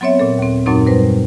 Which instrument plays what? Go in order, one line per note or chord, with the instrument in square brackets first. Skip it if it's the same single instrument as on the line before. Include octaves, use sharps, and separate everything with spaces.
[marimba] F#3 B3 C4 C#5 E5
A#2 A4
D#2 C4
F#2 A#2 F#3 C4 D#4
G3 B4 C5